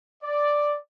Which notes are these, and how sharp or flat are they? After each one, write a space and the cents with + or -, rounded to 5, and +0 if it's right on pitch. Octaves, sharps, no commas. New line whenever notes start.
D5 +0